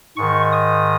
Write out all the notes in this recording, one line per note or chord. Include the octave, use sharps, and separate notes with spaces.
G#2 D#3 C#6
D#6